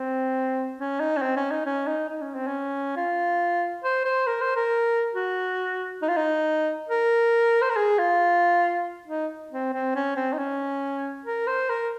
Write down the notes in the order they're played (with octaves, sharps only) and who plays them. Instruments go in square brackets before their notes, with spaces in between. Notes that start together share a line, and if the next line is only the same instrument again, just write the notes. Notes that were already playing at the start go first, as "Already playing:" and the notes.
Already playing: [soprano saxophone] C4
C#4
D#4
C#4
C4
C#4
D#4
C#4
D#4
D#4
C#4
C4
C#4
F4
C5
C5
A#4
C5
A#4
F#4
D#4
F4
D#4
A#4
C5
A#4
G#4
F4
D#4
C4
C4
C#4
C4
D#4
C#4
A#4
C5
A#4